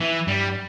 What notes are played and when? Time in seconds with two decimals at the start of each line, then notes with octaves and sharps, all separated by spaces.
0.01 E3
0.27 G2 G3